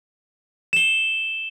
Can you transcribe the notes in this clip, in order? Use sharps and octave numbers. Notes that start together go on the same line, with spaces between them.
E7 G7